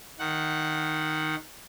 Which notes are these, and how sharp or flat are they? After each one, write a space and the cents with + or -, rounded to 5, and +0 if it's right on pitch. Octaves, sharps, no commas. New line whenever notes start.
D#3 +0 F#5 +0